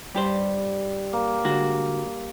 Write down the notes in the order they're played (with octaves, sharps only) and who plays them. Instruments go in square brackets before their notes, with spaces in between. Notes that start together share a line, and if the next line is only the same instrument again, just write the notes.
[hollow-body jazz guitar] G2 G4 C5 [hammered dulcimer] G3
[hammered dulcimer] A#3
[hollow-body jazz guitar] D3 G#3 F#4